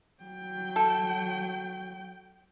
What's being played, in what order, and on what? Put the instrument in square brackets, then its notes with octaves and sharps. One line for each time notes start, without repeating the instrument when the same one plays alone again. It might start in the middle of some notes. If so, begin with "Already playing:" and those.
[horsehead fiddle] F#3 G5
[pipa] A4